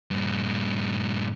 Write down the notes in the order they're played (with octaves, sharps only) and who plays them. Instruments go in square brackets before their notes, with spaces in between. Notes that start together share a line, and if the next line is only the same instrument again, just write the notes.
[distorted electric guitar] G2 A#2